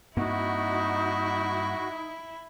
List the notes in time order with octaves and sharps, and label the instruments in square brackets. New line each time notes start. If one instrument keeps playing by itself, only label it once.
[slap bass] G2 A#3 C4 [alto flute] D#4 [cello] E4 [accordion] F#4